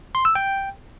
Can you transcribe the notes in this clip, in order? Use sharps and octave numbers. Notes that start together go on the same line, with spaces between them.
C6
E6
G5